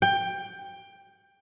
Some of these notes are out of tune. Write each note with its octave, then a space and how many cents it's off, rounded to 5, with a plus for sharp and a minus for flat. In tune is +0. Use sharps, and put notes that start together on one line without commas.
G5 +15